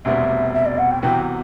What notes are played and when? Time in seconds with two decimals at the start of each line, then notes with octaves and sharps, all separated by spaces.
0.05 E1 D2 C3 G3 B3 E5
0.54 E5
0.66 D5
0.78 F#5
0.91 G5
1.02 C2 C3 E3 B3 F#4 G5